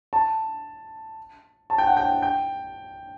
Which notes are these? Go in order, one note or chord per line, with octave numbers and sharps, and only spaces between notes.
A5
A5
G5
F#5
G5
G5